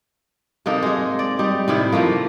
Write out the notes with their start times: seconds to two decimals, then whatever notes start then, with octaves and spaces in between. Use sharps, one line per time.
0.66 C3 A#3 D#4 A4
0.82 G#3 G#4
1.19 D5
1.39 G3 D#4
1.68 A2 C3 D#3 E4
1.92 F3 A3 A#3